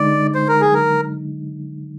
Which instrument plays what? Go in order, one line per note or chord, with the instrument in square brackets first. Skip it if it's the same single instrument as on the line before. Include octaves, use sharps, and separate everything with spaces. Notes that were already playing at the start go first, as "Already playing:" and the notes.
Already playing: [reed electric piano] D3 G#3 D#4 [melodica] D5
[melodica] C5
A#4
G#4
A#4